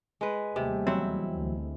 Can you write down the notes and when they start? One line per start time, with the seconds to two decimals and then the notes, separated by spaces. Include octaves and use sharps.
0.21 G#3 B4
0.56 D#2 C3 G3 A3
0.87 E2 F#3 C4 E4
1.34 D2